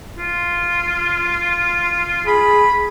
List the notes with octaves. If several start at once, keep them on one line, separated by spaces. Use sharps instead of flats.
F4
G#4 B5